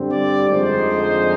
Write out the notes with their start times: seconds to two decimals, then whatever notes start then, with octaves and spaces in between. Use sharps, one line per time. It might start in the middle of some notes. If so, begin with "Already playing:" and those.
Already playing: G2 D3 G3 C4
0.11 D5
0.48 F2 D3 F3 G#3 D#4 C5